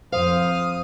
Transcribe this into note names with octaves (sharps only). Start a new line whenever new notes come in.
F2 C5 F5 D#6